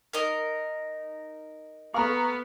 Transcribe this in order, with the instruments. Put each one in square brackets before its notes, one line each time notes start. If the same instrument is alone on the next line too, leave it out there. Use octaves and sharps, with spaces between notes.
[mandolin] D#4 A#4
[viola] B3 [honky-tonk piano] A4 A#5 C#6 [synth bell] F5 F6